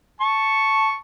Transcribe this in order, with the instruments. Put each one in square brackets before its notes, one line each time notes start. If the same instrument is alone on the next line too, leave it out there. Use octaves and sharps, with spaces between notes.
[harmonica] A5 C#6